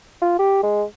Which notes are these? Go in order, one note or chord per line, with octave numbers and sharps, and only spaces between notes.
F4
G4
G#3